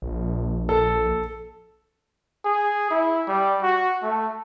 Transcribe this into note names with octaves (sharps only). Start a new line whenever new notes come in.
A#1
A4
G#4
E4
G3
F#4
A3